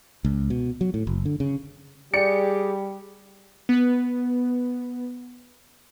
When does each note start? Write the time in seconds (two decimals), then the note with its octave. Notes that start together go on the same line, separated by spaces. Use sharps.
0.25 C#2
0.50 B2
0.81 F#3
0.94 A2
1.07 F#1
1.25 D3
1.40 C#3
2.14 G3 G4 G#4 D5 C#7
3.69 B3 B4